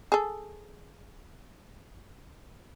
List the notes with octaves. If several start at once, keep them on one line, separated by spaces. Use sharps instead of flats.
G#4 A4